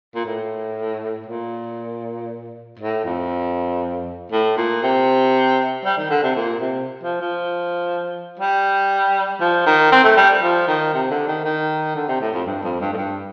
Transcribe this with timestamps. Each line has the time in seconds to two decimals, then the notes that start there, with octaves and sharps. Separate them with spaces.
0.15 A#2
0.25 A2
1.27 A#2
2.79 A2
3.05 F2
4.32 A2
4.57 A#2
4.83 C3
5.85 G3
5.98 D#3
6.10 D3
6.23 C3
6.36 A#2
6.60 C3
7.03 F3
7.21 F3
8.39 G3
9.41 F3
9.66 D#3
9.92 C4
10.04 A3
10.17 G3
10.42 F3
10.68 D#3
10.94 C3
11.11 D3
11.28 D#3
11.45 D#3
11.96 D3
12.08 C3
12.21 A2
12.33 F2
12.46 G2
12.63 F2
12.81 G2
12.92 A2
12.97 G2